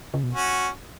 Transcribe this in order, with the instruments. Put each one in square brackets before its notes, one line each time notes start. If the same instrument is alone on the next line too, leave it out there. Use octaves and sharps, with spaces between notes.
[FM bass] C#3
B2
[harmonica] C#4 F#4